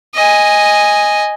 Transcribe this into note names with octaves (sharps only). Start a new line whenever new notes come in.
D#5 G#5